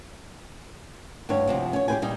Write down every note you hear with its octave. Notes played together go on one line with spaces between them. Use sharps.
D2 G2 D4 C#5
D2 C3 F3
C#4 C#5
G4 G#4 A#4 B4 G5 G#5
A#2 G3 D#4